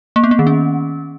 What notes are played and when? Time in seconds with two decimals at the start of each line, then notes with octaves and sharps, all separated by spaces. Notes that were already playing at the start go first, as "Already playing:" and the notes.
0.16 A#3
0.24 B3
0.31 A#3
0.39 D#3
0.47 C#4